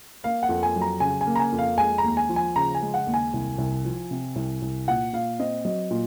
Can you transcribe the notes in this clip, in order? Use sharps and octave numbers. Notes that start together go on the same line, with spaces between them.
A#3 F5
F#5
F2
G#5
F#3
A#5
C#3 G#5
G#5
A#3
A#5
G#5
F2
F5
G#3 G#5
A#5
D#2
G#5
F3
G#5
C#3 A#5
G#5
G#3
F#5
D#2
G#5
C2
C2
F3
C3
C2
C2
A#2 F#5
A#2 F5
C4 D#5
F#3 D#5
A#2